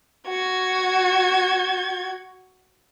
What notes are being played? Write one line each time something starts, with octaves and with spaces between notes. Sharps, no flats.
F#4 G#6